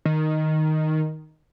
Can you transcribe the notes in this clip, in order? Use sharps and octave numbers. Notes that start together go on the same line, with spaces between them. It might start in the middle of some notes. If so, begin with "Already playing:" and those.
D#3